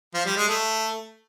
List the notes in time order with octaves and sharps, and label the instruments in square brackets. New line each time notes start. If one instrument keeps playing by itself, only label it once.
[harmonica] F3
G3
G#3
A3